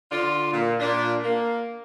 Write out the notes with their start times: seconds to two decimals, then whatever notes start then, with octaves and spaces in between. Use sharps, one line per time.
0.12 D3 D4 F4
0.53 A#2
0.80 A#2 D4
1.24 A#3